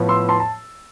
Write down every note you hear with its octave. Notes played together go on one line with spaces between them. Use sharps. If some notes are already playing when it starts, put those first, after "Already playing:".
Already playing: A2 F3 B3
C6 E6
A5 C6
A5